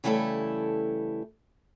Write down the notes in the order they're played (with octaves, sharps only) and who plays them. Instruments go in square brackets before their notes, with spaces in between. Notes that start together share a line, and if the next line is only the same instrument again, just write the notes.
[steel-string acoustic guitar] C#3 E3 G3 A3 E4 A4